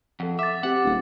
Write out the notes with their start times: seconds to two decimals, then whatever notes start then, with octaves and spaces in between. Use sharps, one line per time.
0.20 F2 A4 F#5
0.39 E5 D6 A6
0.63 C4 G4 F#5
0.85 D#1